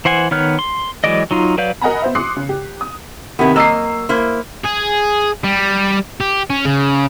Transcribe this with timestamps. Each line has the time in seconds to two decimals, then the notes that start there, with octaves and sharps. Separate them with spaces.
0.05 E3 C5 F#5 G#5
0.31 D#3 B3 C#5 F6 F#6
0.59 C6
1.04 E3 F#3 G#3 D5 D#5
1.31 F#3 D#4 F4
1.58 F#3 B4 D5 F5 G6
1.81 A#4 D#5 F#5 G#5 A#5 B5
2.02 B3 C5 E5
2.15 C6 D6 D#6 F#6 C7 C#7
2.36 C#3
2.49 G4
2.81 D#6
3.39 C3 D#3 B3 E4
3.56 F#3 A#3 D#5 E6 C7
4.09 A#3 E4 C5
4.64 G#4
5.44 G3
6.20 G4
6.50 C#4
6.65 C#3